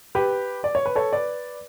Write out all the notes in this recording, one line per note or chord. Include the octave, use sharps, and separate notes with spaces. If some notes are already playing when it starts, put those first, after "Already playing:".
G4 B4
D5
C#5
B4
A4 C#5
B4 D5